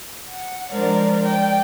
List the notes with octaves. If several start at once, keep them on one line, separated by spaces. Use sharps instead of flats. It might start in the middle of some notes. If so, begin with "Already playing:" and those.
F#5
F3 G#3 D4 A#4 C5 D5
D5 G5